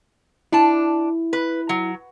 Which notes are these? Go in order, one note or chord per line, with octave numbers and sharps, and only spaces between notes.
D4 E4 A5
B4
F#3